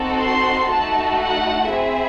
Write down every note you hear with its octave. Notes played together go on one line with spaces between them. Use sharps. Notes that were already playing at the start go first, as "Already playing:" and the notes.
Already playing: C4 D#4 F#4 A4
C6
A3 D#4 F#4 A4 A5
F#5
C4 E4 G#4 E5